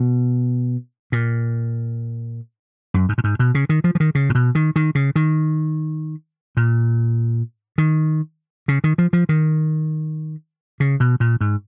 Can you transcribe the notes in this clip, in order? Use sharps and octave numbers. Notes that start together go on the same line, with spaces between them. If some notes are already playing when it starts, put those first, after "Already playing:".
Already playing: B2
A#2
F#2
G#2
A#2
G#2
B2
C#3
D#3
F3
F3
D#3
C#3
A#2
B2
D#3
D#3
C#3
D#3
A#2
D#3
C#3
D#3
F3
F3
D#3
C#3
B2
A#2
G#2